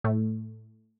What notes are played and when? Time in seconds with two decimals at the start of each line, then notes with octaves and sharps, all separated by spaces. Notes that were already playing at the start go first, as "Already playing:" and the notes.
0.04 A2 A3